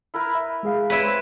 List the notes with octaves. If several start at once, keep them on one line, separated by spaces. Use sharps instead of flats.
E4 A#4 B4
E5
G#3 G#4 F5
E4 B4 C#5
C4